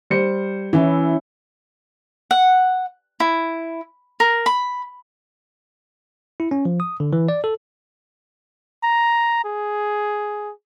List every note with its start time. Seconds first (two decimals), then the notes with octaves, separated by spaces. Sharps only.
0.10 G3 C5 C#7
0.73 E3 C#4 E4
2.31 F#5
3.20 E4
4.20 A#4
4.46 B5
6.40 E4
6.51 C#4
6.65 F3
6.80 D#6
7.00 D3
7.13 E3
7.29 D5
7.44 A4
8.83 A#5
9.44 G#4